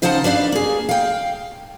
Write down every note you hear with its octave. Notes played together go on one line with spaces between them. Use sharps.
C#3 D#4 C5 F5 F#5 A5
D4 B4 D5 F5
A#3 G#4
F5 G5